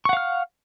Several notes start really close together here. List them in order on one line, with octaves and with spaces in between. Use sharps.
C#6 F#5 F5 F6